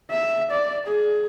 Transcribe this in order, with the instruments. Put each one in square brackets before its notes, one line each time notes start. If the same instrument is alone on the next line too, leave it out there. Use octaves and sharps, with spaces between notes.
[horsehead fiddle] E5
D5
G#4